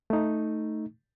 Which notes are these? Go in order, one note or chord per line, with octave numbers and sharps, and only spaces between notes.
A3 D#4